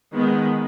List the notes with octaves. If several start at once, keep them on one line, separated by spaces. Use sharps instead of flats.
D#3 G#3 B3